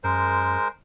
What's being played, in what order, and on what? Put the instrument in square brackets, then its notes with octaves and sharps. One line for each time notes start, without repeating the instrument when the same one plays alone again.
[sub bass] F#2 [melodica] G#3 A#4 C5